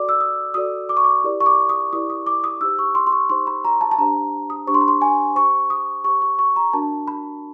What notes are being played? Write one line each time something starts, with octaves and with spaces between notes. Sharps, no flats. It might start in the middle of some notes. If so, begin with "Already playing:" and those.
Already playing: F#4 A4 D5 D6
E6
D#6
F#4 A4 D5 D#6
D6
C#6
D6
E4 G4 A#4 D5
C#6
D6
D#6
E4 G4 A#4 D5 D#6
D#6
D6
D#6
D#4 G4 C5 E6
C#6
C6
C6
C#6
D#4 G4 C5 C6
B5
A#5
A5
A5
D4 G4 C5 A#5
D#6
D4 G4 C5 C#6
C6
B5
C6
G#5
G4 C5 C#6
D#6
G4 C5 C#6
C#6
C#6
A#5
D4 F#4 A#4 A5
B5